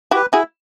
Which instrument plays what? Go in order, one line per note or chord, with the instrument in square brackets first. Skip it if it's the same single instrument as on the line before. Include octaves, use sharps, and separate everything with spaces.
[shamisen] E4 F#4 [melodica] G4 B4
[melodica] E4 [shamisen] F#4 G#4